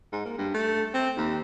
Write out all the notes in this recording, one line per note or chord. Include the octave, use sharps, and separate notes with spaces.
G#2
A#3
G2
A3
C4
D#2